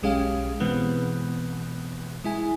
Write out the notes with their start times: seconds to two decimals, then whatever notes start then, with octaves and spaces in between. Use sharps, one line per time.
0.03 B1 G#3 C#4 G4 F5
0.60 B2 E3 G#3 B3 C4
2.24 G#3 E4 G#5